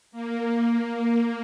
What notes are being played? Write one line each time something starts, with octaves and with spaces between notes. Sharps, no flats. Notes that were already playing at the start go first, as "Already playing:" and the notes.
A#3